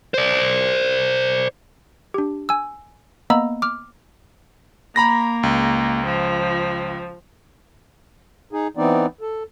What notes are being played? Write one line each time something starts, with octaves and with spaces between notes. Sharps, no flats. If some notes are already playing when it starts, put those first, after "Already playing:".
C5 D5
D4 G4
G#5 E6
A#3 B3 D#5 A#5 B5 E6
D6 F6
A#3 A#5 B5 A#6
C#2
F3
D#4 G#4
E3 B3 C4 D#4 D5
A4